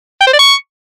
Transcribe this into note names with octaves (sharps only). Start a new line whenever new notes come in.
G5
C5
D5
C#6